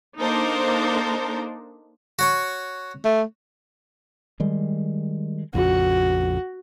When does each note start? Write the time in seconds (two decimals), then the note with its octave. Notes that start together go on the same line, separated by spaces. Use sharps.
0.21 A#3 D4 D#4 A4 A#4 C5
2.19 F#4 C#5 C#6
3.05 A3
4.40 D#3 G3 G#3
5.54 A#1 F2 C#3 F#4